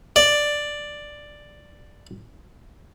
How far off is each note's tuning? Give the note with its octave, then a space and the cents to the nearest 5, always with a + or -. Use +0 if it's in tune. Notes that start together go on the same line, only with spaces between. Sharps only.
D5 +5